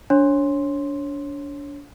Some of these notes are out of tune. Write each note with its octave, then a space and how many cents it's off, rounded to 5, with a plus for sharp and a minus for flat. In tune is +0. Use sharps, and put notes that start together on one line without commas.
D4 -30 C#5 -25 C6 +0